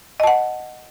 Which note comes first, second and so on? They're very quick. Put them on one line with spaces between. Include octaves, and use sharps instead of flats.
D#5 A5 F#5